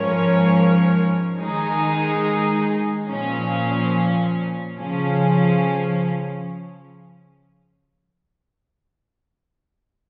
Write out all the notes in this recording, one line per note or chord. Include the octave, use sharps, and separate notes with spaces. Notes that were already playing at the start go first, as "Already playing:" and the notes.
Already playing: G#2 F3 C#4 A#4 C#5
D#3 G#3 D#4 G#4
A#2 F3 C#4
C#3 F3 C#4